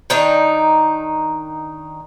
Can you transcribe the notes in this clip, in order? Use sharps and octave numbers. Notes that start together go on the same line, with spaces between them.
D#3 D4 D#4 A#5